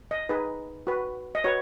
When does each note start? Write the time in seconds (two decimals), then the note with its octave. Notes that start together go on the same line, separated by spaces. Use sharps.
0.11 D#5
0.29 D#4 G#4 B4
0.87 F#4 B4
1.35 D#5
1.44 F#4 B4 C#5